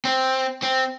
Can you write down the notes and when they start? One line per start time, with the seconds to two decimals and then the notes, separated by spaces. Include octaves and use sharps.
0.05 C4
0.63 C4